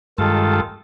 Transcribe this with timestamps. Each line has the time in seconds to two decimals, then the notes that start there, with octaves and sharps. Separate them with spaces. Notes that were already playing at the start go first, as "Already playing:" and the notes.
0.18 G2 D#3 G#3 F4 A4 A5